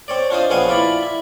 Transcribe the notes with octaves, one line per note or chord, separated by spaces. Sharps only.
C4 C#5 D5
D4 F4 C5 D#5
A#1 B3 C4 C#5 F5 G#5
E4 F4 D5 B5
E4